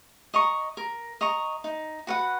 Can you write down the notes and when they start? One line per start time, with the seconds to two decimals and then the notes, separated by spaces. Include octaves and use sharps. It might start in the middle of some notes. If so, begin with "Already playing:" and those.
0.34 D#5 A#5 C#6
0.77 A#4
1.21 D#5 A#5 C#6
1.64 D#4
2.07 F#4 B4 F#5